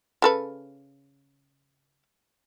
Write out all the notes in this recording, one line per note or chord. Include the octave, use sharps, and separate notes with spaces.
C#3 A4 B4